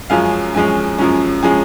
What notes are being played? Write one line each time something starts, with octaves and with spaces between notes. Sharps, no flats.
F#2 F3 G#3 C#4 F5
F#2 F3 G#3 C#4 G#5
F#2 F3 G#3 C#4
F3 G#3 C#4 G#5